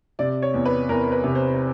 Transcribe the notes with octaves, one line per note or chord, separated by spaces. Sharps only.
C3 D5
C#5
E2
B4
E2 A#4
B4
C3
C5